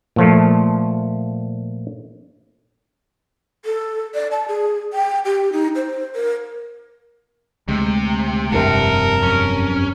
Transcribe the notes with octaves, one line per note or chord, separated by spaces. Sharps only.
A#2 F3 A3
A4
D5
A5
G#4
G5
G4
D#4
C5
A#4
D2 C3 G#3
F1 G2 C3 A#4 F#5 A5
F#2 C#4